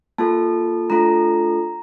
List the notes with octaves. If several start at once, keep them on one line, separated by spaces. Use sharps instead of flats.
A#3 F4 A4 A5
A3 D4 F4 A4 A#5